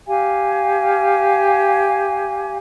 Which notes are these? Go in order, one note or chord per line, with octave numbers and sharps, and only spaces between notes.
G4 F5 G#5